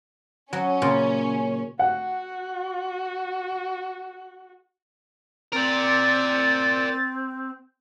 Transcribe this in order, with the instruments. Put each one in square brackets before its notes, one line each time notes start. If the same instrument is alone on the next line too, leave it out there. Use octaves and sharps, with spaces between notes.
[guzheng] F#3 [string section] C#4
[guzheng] A#2 C#3
[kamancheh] F#4 [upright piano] F#5
[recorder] C4 [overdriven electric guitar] A#4 D5 [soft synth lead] A6